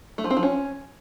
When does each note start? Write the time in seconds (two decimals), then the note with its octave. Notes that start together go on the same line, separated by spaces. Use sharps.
0.18 A3
0.24 F3
0.30 C4
0.37 F3
0.43 C#4